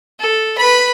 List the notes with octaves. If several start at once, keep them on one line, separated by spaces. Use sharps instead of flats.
A4
B4 B5